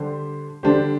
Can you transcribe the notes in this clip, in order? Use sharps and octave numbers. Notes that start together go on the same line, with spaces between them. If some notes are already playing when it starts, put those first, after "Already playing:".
Already playing: D3 G3 D4 G4 C5
D3 G3 D4 G4 C5